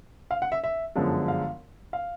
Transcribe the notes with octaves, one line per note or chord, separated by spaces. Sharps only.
F5
F#5
E5
E5
G1 F#2 D3 F3 G#3
F5
F5